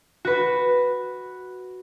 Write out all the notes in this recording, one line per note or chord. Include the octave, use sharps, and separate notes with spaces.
F#4 B4